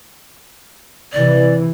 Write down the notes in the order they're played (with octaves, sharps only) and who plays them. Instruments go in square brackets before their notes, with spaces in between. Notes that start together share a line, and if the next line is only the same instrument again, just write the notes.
[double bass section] C3 E3 [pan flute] D5